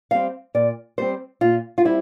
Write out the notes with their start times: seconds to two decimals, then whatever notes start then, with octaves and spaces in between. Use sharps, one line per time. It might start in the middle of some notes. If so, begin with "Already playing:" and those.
0.11 G3 C4 F5
0.54 A#2 D5
0.98 G3 C4 C5
1.41 A#2 F4
1.78 F4
1.84 G3 C4 E4